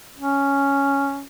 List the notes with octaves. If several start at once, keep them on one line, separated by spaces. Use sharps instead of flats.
C#4